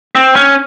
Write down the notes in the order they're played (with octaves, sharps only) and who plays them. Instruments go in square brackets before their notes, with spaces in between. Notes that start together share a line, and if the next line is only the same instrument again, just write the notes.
[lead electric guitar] C4
C#4